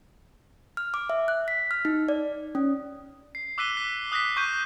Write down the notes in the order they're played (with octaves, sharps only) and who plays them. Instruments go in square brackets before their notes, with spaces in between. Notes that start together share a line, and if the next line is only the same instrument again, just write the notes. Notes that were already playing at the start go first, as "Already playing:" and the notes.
[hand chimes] F6
D6
E5
F#6
B6
F6
D#4
D5
C#4
[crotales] C7
D6 E6 F#6 B6 D#7 G7
B6
D#6 F#6 A#6 B6
C#6 G6 D#7